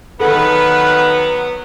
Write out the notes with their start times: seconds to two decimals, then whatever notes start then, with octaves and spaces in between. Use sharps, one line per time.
0.20 D#3 F#3 B3 A4 B4